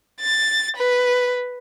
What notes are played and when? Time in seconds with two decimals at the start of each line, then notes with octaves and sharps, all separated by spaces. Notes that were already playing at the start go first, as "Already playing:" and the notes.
0.21 A6
0.77 B4